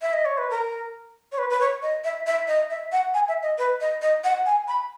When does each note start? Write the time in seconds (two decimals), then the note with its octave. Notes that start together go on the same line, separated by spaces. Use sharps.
0.01 E5
0.13 D#5
0.25 C#5
0.38 B4
0.50 A#4
1.32 C#5
1.38 B4
1.50 B4
1.61 C#5
1.82 D#5
2.04 E5
2.26 E5
2.47 D#5
2.70 E5
2.92 F#5
3.14 G#5
3.28 E5
3.43 D#5
3.58 B4
3.80 D#5
4.02 D#5
4.24 F#5
4.46 G#5
4.68 B5